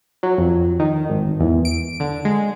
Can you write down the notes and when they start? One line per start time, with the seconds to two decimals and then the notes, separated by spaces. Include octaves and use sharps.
0.23 F#3
0.38 F2
0.80 D#3
1.10 G#1
1.40 E2
1.65 D7
2.00 D3
2.25 G#3